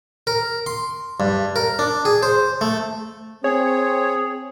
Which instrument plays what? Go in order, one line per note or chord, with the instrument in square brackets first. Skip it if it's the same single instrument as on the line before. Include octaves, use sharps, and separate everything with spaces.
[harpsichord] A#4
C6
G2
A#4
D4
G#4
C5
A3
[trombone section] C4 [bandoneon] G#4 [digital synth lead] C#5